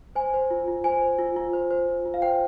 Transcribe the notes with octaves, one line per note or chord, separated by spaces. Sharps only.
C5 G#5
C5
F4
F4
C5 G#5
C5
F4
F4
C5
C5
F4
F4
F5
C5 G5